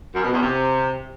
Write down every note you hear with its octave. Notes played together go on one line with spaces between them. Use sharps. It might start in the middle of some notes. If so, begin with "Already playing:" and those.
F#2
B2
E2
C3